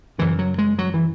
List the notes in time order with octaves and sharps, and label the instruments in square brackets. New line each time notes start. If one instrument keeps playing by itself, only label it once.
[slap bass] F#2 C#3 E3
F#3
G#3
F#3
E3